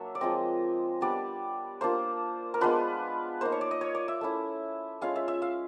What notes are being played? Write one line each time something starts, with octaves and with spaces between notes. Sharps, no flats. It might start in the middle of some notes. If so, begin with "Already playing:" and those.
Already playing: F#3 A#3 D4 E5
D5
F3 G#3 C4 D#5
G3 B3 D4 D5
A#3 D4 F4 C5
A#4
G#3 B3 D4 F4 B4
A#3 D#4 C5
C#5
D5
D#5
C#5
D5
E5
A3 C#4 E4
G#3 C#4 F4 F5
E5
E5
F5